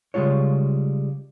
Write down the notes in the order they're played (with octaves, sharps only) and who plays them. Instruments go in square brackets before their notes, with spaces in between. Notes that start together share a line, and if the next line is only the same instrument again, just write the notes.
[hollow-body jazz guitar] C#3 G3 G#3 F4 C#5